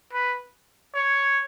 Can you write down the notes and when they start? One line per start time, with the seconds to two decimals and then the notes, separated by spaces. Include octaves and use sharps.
0.13 B4
0.94 C#5